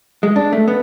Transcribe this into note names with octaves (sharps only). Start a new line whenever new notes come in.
G#3
D4
A3
B3